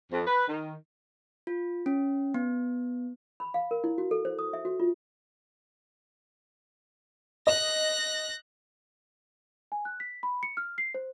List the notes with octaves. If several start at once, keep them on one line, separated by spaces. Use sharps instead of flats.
F2
B4
D#3
F4
C#4
B3
B5
F5
A#4
E4
F#4
A4
C5
D#6
E5
F#4
F4
D#5 F#6 A#6
G#5
F#6
B6
B5
C#7
F6
C7
C5